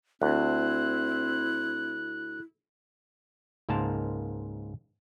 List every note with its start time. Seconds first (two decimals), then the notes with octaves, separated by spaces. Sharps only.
0.22 D2 C4 E4 F#6
3.69 C#2 G#2 A#3 A#4 C5 A5